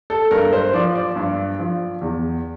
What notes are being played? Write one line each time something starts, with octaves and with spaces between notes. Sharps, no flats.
A4
G2 A#4
C5
F3 D5
D5
G2
F3
E2